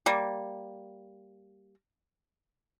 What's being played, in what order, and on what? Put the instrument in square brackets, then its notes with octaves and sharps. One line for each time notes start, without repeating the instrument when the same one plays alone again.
[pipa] G3 A#3